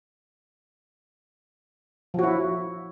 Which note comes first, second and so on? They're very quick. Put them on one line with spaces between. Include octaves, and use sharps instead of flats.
F3 F#4 E4